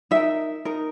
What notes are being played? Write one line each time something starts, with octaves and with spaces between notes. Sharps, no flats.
D#4 A#4 E5
D#4 A#4